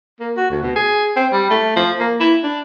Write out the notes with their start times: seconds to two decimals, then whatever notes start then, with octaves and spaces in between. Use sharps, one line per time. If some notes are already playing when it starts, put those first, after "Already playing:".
0.20 A#3
0.37 F#4
0.50 D2
0.62 B2
0.76 G#4
1.16 C4
1.33 G3
1.50 A3
1.76 F3
2.00 A#3
2.20 E4
2.44 D4